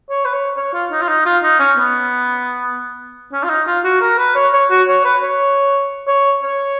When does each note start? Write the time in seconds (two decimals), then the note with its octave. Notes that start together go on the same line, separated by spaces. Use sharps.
0.10 C#5
0.25 B4
0.33 C#5
0.57 C#5
0.73 F4
0.91 D#4
1.02 F4
1.08 D#4
1.25 F4
1.43 D#4
1.60 C#4
1.78 B3
3.33 C#4
3.43 F4
3.50 D#4
3.67 F4
3.84 F#4
4.01 A#4
4.18 B4
4.36 C#5
4.53 C#5
4.71 F#4
4.88 C#5
5.05 B4
5.22 C#5
6.07 C#5
6.43 C#5